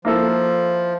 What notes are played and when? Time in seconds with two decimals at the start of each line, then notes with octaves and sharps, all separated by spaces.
0.05 F3 A#3 E4 A4